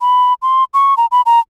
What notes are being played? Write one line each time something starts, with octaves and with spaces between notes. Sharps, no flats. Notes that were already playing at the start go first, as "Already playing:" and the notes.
B5
C6
C#6
A#5
B5
A#5